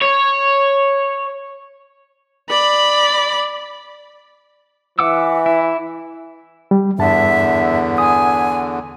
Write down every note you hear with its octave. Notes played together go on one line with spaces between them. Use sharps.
C#5
D5 B5
E3 E5 F#5 D6 E6
E4
G3
E2 G2 D3 E5 A5
G#5 D#6